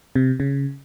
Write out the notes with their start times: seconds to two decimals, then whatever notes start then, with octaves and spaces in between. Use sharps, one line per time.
0.16 C3
0.40 C#3